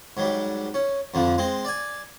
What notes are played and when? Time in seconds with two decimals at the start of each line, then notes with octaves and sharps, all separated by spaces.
0.17 G#2 F#3 G3
0.74 C#4
1.14 F2 D3 F3
1.38 G#3 C4
1.65 D5 G#5